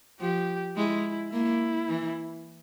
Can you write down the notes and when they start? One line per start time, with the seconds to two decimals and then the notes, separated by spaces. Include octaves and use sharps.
0.20 F3 G4
0.76 G#3 E4
1.32 A#3 E4
1.88 E3